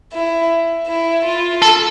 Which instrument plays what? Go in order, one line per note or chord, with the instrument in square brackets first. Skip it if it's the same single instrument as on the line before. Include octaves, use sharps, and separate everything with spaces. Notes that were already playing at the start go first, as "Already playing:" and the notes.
[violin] E4
E4
F4
[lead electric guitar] A4